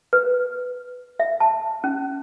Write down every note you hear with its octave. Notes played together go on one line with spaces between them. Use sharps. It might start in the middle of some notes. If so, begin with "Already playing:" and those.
B4
E5
A5
C#4